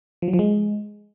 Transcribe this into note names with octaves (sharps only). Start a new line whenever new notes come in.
F3
F#3
F3
G#3